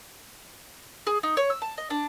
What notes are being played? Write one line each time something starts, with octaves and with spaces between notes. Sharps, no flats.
G#4
D#4
C#5
E6
A5
D#5
D4